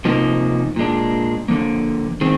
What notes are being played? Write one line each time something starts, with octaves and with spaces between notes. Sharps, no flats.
C3 F3 A#3 D#4
A#2 G#3 D4
D3 F3 A#3
D#3 G#3 C4